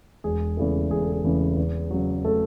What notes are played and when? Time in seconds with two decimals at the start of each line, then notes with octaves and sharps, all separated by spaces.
0.24 E1 G#4
0.57 E2 C#3 E3 A3
0.90 E1 G#4
1.01 A4
1.13 G#4
1.24 E2 C#3 E3 A3
1.57 E2
1.91 C#3 F#3
2.24 A3 A4